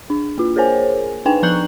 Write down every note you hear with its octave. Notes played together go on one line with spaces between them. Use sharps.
D4
A#3 F4
G#4 A#4 C5 C#5 G#5
D4 D#4 B4 G5 G#5
F3 A#5 C#6 F#6 G6 F#7